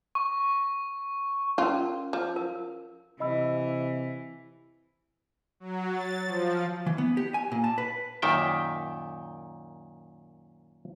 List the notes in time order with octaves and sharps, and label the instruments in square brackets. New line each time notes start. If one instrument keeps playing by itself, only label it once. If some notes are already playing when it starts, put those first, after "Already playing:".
[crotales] C#6
[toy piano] C#4 A#4 [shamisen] F4
[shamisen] F3
[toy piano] A#4
[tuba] C3 [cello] E3 [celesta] D#5 B5 E6
[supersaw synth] F#3
A6
F3
[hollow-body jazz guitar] E3
B3
G4
G#5
A#2
A5
B4
[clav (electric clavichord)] F#2 A#2 D#3 E5 G5